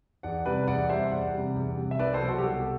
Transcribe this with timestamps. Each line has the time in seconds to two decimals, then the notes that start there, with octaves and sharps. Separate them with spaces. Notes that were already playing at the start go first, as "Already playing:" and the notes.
0.23 E2 D5 F#5
0.45 C3 G3 B4 D5
0.68 E2 D5 F#5
0.89 C3 G3 C5 E5
1.12 E2 D5 F#5
1.33 C3 G3
1.55 E2
1.77 C3 G3
1.91 E5
1.99 C2 B4 D5
2.13 A4 C5
2.21 B2 F#3
2.28 F#4 A4
2.38 G4
2.43 C2 F#4 A4